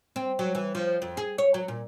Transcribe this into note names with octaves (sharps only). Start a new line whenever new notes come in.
C4
F#3
E3
F3
F2
G#4
C#5
F#3
A#2